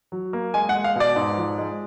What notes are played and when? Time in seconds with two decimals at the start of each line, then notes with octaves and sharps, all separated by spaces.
0.12 F#3
0.33 A#3
0.54 G#3 G#5
0.69 F#5
0.74 G#3
0.84 F5
0.95 B2 D5
1.16 G#2
1.37 F3
1.58 G#3